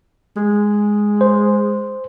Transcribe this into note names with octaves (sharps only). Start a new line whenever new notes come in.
G#3
C5